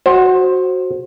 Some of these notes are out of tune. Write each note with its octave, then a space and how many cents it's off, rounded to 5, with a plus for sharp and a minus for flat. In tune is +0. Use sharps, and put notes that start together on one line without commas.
F#4 +0 C5 +15